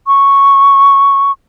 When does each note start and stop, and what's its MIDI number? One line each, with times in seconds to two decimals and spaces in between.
0.07 1.32 85